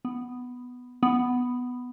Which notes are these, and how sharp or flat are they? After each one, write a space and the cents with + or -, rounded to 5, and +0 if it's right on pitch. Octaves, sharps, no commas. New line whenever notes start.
B3 +5
B3 +5